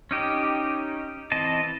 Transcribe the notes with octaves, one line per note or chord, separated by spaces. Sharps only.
C#4 D#4 G4
E3 C4 D#5 A5